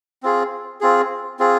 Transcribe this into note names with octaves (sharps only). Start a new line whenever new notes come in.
C4 F4 G#4
C4 F4 G#4
C4 F4 G#4